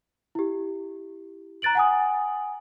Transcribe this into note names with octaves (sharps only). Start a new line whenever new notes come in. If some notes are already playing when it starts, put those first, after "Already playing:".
E4 G4
A#5 F#6 A6 D7 F#7
F#5 G#5 D#6